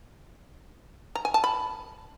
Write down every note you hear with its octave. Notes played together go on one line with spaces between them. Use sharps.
A#5
G#5
A5
B5